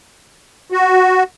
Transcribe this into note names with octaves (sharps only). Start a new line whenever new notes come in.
F#4